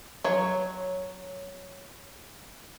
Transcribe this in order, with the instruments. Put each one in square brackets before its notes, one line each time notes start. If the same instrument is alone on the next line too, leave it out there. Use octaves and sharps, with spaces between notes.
[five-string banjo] F#3 C#5